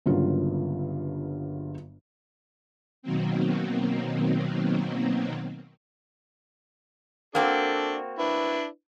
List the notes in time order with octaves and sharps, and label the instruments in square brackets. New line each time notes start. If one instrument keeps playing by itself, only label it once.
[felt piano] G1 G2 C#3 F#3 A#3 F4
[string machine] B2 D#3 F#3 A#3 C4
[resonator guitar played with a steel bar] A#3 C4 F#4 [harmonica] D4 A4
[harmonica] D4 E4 B4